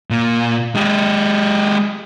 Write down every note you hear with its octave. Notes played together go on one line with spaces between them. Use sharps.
A#2
G#3 G4